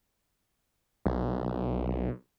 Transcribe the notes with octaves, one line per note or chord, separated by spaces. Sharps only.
B1